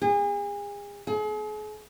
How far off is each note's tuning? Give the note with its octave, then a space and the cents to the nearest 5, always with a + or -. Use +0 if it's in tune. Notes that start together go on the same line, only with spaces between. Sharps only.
G#4 -35
G#4 +40